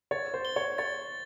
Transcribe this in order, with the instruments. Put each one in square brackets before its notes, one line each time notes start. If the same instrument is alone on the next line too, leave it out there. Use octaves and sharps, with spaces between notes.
[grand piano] C#5 [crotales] A6
[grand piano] C5
[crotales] G7
[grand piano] C#5
[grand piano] C#5 [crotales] A6